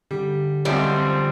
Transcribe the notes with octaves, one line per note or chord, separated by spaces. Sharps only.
D3 G3
G#1 F#2 F3 G3 C4 E5